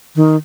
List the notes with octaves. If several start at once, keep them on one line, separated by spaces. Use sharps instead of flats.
D#3